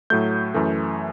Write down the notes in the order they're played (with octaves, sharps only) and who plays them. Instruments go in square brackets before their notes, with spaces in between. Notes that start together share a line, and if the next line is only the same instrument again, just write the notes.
[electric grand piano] A2 F#3 A3 G6
F#2 E3 A3